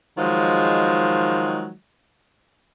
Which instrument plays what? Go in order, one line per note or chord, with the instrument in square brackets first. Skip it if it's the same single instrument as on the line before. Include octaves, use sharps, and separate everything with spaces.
[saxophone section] D#3 F3 F#3 G#3